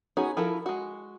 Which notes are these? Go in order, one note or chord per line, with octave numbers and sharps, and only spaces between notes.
B3 C#4 D#4 F#4 G#4
F3 E4 A4 A#4
G#3 F#4